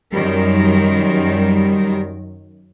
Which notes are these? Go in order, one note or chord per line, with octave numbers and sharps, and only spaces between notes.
F#2 D#3 G3 A#4